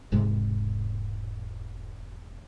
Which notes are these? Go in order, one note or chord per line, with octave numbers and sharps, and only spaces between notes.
E1 G#2 C3 G#3